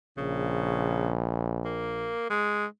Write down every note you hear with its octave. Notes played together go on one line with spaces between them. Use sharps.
A#1 C#3
A#3
G#3